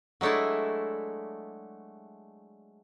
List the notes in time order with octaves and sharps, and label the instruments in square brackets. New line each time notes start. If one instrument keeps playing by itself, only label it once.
[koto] F#3 G#3 A3 D4 E4